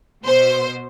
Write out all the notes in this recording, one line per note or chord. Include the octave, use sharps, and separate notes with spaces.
B2 C5